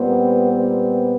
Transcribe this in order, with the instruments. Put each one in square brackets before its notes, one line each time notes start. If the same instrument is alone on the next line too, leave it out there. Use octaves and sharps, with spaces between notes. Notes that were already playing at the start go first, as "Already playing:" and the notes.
Already playing: [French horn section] A#2 G3 C4 [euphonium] B3
[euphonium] B3